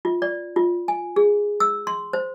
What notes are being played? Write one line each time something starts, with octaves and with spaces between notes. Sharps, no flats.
F4
D5
F4
G#5
G#4
E6
C6
C5